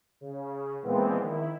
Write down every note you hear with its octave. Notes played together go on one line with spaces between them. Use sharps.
C#3
A#2 E3 F3 G#3 B3 C4
D#3 E4